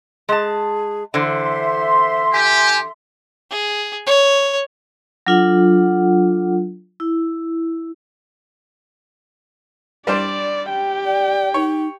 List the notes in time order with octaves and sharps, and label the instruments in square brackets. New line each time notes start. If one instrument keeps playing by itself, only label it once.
[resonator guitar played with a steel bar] G#3 A5 [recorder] G#4
[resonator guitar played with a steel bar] D3 E3 [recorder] C5 [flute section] E5 C6
[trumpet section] G4 [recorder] G#5
[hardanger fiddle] G#4
C#5
[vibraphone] F#3 D4 F4 A4 F#5
E4
[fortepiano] G3 D4 C5 [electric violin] D5
[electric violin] G4 G5
[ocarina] D5
[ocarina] D#4 [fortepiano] C#5